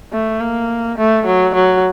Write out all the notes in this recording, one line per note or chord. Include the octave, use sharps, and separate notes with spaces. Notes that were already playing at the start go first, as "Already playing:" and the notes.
A3
A#3
A3
F#3
F#3